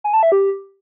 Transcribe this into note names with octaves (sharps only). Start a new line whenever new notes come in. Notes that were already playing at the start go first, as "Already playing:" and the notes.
G#5
A5
E5
G4